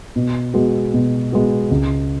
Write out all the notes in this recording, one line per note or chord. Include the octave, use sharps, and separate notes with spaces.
B2
G#3 B3 F#4
B2
G#3 B3 F#4
C#2